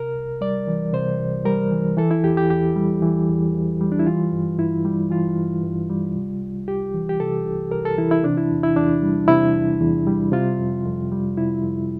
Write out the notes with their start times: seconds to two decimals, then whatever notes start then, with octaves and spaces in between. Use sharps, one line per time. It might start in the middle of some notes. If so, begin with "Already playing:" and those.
Already playing: C3 A#4
0.15 C2
0.41 G3 D5
0.68 E3
0.93 C3 C5
1.20 C2
1.45 G3 A#4
1.71 E3
1.97 E3 A4
2.11 E4
2.24 E2 G4
2.37 G4
2.50 E2 G4
2.76 G3
3.02 E3
3.29 E2
3.54 E2
3.81 G3
3.92 D4
3.99 E4
4.06 E3 F4
4.32 G2
4.59 G2 E4
4.85 G3
5.10 E3 F4
5.37 G2
5.63 G2
5.89 G3
6.15 C3
6.41 C2
6.67 C2 G4
6.94 E3
7.09 G4
7.20 C3 A4
7.46 C2
7.71 C2 A#4
7.85 A4
7.98 E3 E4
8.11 E4
8.24 C3 D4
8.37 E4
8.51 E2
8.63 E4
8.76 E2 D4
9.03 G3
9.28 C3 E4
9.55 E2
9.81 E2
10.07 G3
10.32 C3 F4
10.59 F2
10.85 F2
11.12 G3
11.37 C3 E4
11.63 F2